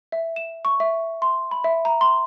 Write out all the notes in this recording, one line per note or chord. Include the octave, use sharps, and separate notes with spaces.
E5
E7
C#6
E5
C6
B5
E5
A#5
C6